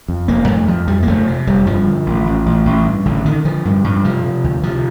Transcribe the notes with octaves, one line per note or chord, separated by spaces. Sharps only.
F2
F1 A#3
F2 A3
F2 F3
F2 G3
A#3
F1 A3
C3
F1 G3
G2 F3
D3
A1
A1
A1
A1
G2
A1 D3
D3 D#3
D3 F3
G2
G2
C3 F3
C3
D2
C3 F3